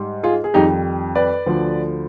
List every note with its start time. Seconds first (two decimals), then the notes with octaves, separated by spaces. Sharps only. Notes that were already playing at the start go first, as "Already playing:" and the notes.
Already playing: G#2 G3
0.23 F4 G#4
0.44 G#4
0.54 F2 D#3 G3 D#4 G4
1.15 B4 D5
1.46 D2 D3 F3